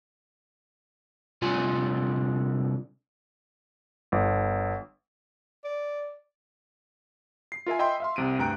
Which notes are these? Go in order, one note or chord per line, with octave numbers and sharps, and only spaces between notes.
C2 D3 F4 G#5
G1
D5
C7
F4 A#4 E5 G#5
D#5 E5 G5 B5 C6
E5 F5 C6
C2 C3 D7 D#7
D2 G2 G5 A#5 F#6 D7